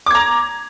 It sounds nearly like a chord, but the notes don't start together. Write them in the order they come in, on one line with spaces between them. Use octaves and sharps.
D6 G#6 A#5